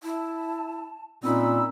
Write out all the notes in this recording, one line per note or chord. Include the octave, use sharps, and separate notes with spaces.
E4 A5
A#2 C4 C#4 D#4 B5 E6